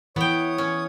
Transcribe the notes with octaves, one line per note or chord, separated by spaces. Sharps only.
E3 B3 C#5 G5 D#6
C#4